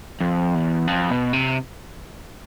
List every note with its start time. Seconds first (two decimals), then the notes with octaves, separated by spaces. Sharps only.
0.20 F2
0.55 E2
0.87 F2
1.10 B2
1.33 C3